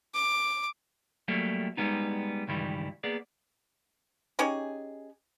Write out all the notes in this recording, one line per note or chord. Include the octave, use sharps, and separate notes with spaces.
D6
F#3 G3 A3 A#3
G3 G#3 B3 D#4
C#2 G2 D#3 E3 G3
A#3 B3 G#4 D5
C#4 D#4 G4 G#4